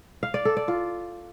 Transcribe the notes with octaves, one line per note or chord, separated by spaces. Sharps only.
F5
D5
A4
D5
F4